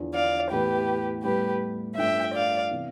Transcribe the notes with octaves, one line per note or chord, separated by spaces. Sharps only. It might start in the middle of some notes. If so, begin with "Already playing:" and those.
Already playing: E2 D3 F3
D5 F5
A2 E3 B3 G4 B4
A2 G3 B3 G4 B4
G2 F3 A3 D4 E5 G5
D5 F5
C3 E3 B3